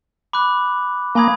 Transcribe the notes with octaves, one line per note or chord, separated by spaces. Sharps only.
B5 D6 F#6
A#3 G#5 B5 D#6 G#6